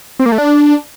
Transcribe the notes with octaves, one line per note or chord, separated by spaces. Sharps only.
C4
A#3
A3
D4